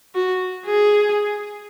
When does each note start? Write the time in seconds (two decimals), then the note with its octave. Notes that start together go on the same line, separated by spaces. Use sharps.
0.15 F#4
0.66 G#4